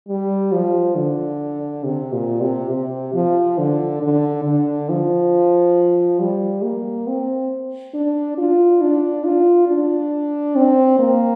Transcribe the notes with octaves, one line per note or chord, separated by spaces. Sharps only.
G3
F3
D3
C3
A#2
C3
C3
F3
D3
D3
D3
F3
G3
A#3
C4
D4
F4
D4
F4
D4
C4
A#3